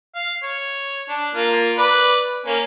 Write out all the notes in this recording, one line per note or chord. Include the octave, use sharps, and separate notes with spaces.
F5
C#5
D4
A#3 F4
B4 D5
A#3 C#4